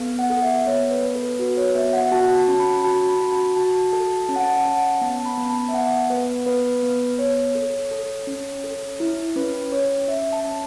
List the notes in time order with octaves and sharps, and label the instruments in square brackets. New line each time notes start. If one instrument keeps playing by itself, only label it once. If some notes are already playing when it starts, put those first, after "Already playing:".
Already playing: [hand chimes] B3 A4
F#5
A4
E5
B3 C#5
B4
B3 B4
A4
A4
F#4 B4
C#5
B3 E5
F#5
F#4 A5
A5
C#4
B5
F#4 A5
B5
F#4
A5
F#4 A5
A4 A5
C#4 A5
F#5
A5
C#4 F#5
B3 A5
B5
B3
A5
E5
B3 F#5
B3 B4
B3 B4
B3
B3 C#5
A4
A4
C#4
A4
E4
C#4 B4
C#4 C#5
C#4 E5
A5
C#4